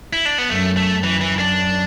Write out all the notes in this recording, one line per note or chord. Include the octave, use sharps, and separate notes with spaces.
E4
D4
B3
F#2 A3
A3
F#2 E3
E3
D4